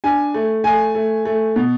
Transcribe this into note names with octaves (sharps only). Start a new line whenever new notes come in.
D4 G#5
A3
A3 G#5
A3
A3
B2